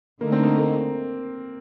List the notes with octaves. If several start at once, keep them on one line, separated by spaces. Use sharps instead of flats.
D3 A3 A#3 D#4
C4
A#3
A#3